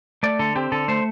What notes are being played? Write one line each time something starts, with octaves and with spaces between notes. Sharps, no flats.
A3 D5
D3 A4
C4 G4
D3 A4
A3 C5